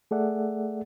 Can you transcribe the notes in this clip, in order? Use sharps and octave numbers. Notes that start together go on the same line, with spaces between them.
A3 G#4 A4 D5 E5 F#5